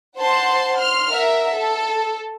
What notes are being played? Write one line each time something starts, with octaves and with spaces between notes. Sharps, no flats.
C5 F#5 A5 C6
C6 F6
A#4 E5 F#5
A4